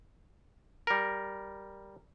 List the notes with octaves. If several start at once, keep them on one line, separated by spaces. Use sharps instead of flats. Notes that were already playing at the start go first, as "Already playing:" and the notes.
G3 A#4